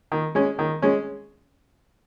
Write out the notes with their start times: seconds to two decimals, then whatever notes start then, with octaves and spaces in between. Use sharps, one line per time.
0.12 D#3
0.35 G#3 C#4
0.59 D#3
0.82 G#3 C#4